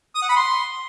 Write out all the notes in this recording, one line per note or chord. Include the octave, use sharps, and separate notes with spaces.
D#6
F#5
B5
C6